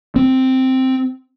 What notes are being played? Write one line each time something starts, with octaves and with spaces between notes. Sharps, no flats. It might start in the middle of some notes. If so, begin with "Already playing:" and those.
C4